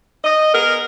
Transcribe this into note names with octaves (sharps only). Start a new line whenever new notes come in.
D#5
B3 G#4 A#4